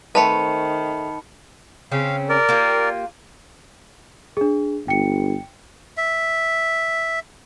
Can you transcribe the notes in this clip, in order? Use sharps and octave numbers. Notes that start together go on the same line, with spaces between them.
D#3 A3 C4 B4 A5 B5 C#7
C#3 C4 C#4 F5
A#4 D5
A#3 F4 G4
D4 G#4
G1 G5 C#7
E5